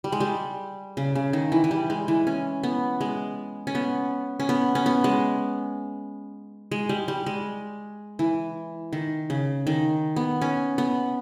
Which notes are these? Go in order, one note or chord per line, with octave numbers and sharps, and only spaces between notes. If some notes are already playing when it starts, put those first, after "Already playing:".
G3
G#3
G3
C#3
C#3
D#3
E3
E3
G3
G#3
E3
C#4
B3
G#3
C#4
B3
C#4
B3
C#4
B3
G#3
G#3
G3
G3
G#3
E3
D#3
C#3
D#3
B3
C#4
B3